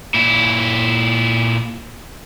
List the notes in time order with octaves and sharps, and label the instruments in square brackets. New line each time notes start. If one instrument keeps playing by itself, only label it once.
[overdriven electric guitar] A#2 E4